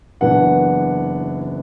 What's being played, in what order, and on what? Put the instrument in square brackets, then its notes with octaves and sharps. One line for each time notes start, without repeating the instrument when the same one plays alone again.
[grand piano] F#1 F#2 E3 B3 D4 F#5